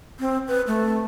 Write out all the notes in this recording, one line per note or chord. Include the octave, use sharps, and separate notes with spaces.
C4
B4
A3